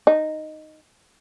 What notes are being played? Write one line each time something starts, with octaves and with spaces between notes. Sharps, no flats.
D#4